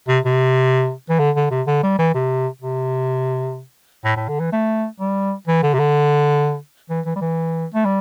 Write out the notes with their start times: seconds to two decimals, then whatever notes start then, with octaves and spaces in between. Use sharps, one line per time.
0.08 C3
0.25 C3
1.09 E3
1.19 D3
1.36 D3
1.51 C3
1.67 D3
1.83 G3
1.99 E3
2.14 C3
2.62 C3
4.05 A2
4.16 A2
4.28 D3
4.40 E3
4.52 A3
5.00 G3
5.47 E3
5.63 D3
5.74 C3
5.79 D3
6.90 E3
7.06 E3
7.16 G3
7.21 E3
7.74 A3
7.85 G3